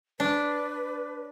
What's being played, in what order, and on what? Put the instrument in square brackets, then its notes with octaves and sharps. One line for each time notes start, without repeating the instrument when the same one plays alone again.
[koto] D4 [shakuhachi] B4 [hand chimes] C#5 D6